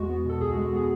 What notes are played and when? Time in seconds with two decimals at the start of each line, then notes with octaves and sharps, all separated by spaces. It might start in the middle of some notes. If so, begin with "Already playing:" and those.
Already playing: E2 G#3 F#4
0.09 B3
0.25 B2 A4
0.41 C#2 G#4
0.53 F#4
0.57 G#3
0.64 F#4
0.73 B3 G#4